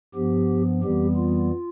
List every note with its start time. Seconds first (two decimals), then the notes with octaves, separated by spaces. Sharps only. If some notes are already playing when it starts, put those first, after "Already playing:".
0.14 G2 F3 B3 G4
0.83 F2 E3 G3 B3 G4
1.17 F4